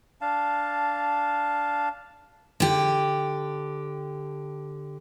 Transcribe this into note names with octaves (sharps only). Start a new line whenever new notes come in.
D4 F5 A5
D3 G4